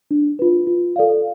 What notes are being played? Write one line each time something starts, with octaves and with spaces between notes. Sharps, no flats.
D4
F4 B4
F4
A4 D5 F5